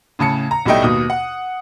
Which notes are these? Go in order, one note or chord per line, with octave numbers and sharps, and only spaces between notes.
A2 C#3 A5 C#7
A#5
B1 A2 G3 A3 D#5 G5
D#2 B2 D#6
F#5